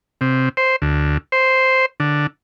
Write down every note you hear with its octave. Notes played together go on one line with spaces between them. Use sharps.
C3
C5
D2
C5
D3